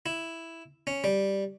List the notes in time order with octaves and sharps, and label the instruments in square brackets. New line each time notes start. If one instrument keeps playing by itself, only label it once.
[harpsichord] E4
C#4
G3